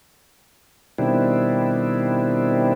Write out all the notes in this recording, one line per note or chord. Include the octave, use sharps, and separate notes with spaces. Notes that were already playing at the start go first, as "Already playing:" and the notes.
B2 D#3 G3 C4 D4 E4